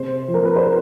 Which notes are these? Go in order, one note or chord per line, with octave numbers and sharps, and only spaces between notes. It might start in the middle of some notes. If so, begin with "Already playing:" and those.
Already playing: C3 C5
F3
A#4
B4
C5